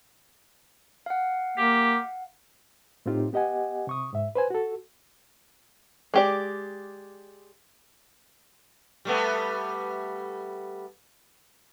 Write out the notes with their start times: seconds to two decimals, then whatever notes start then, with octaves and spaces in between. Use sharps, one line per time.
1.06 F5 F#5
1.58 A#3 G4
3.06 A2 C4 D#4 F4 G4
3.33 B3 G4 D#5 F#5 G#5
3.87 C3 C#6 D#6
4.13 G#2 E5
4.35 B4 C5 G#5
4.50 F#4 A4
6.14 G#3 G4 D5
9.05 G3 A3 B3